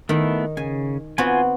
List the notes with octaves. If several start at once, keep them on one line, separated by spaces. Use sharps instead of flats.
D#3 A3 B3 E4
C#3 G#5
B3 C4 F4 F#4 G#5